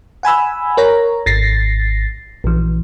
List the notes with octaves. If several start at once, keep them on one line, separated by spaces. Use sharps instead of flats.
F#5 G#5 B5 E6
A#4 C#5 A#5
G#1 A6 A#6 C7
A#1 E3